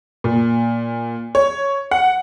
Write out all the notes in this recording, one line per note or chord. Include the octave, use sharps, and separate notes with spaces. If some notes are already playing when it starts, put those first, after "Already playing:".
A#2
C#5
F#5